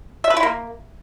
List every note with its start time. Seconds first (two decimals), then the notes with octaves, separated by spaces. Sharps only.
0.24 E5
0.30 B4
0.37 E4
0.43 A#3